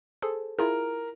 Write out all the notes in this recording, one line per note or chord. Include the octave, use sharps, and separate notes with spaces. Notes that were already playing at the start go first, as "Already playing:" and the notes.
G#4 A4 C5
E4 F4 G#4 A#4